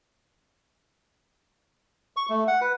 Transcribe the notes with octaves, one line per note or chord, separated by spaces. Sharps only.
C#6
A3
F#5
B4